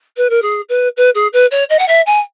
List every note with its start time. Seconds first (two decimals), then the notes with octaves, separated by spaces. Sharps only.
0.17 B4
0.30 A#4
0.42 G#4
0.69 B4
0.97 B4
1.15 G#4
1.33 B4
1.51 C#5
1.69 D#5
1.79 F#5
1.88 E5
2.06 G#5